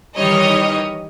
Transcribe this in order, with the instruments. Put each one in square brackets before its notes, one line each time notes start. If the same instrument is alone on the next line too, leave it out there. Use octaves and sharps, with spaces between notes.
[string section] D#3 E3 G3 C#5 D#5